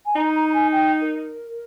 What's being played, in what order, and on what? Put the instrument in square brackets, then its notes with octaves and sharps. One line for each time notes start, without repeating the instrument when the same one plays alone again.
[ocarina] G#5
[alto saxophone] D#4 [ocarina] A#5
[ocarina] A#5
A#5
G#5
G5
A#4